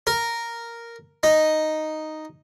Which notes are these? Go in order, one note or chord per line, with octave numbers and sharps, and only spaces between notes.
A#4
D#4